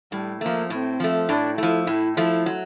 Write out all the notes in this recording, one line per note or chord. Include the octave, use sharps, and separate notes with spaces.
A2 G3
F3 A3 A#3
A2 C4
F3 A3
A2 D4
F3 A3 E4
A2 E4
F3 A3 E4
F#3